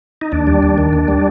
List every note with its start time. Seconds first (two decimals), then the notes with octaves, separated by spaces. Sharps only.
0.21 D#4
0.32 D#2 D4
0.47 G3
0.63 D#2
0.78 D#3
0.93 D#2
1.08 G3